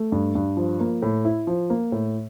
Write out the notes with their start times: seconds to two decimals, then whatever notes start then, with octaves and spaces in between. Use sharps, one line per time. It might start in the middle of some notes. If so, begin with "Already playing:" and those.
Already playing: A3
0.12 G2
0.35 G2
0.57 F3
0.80 A#3
1.02 A2
1.25 E4
1.47 F3
1.70 A#3
1.92 A2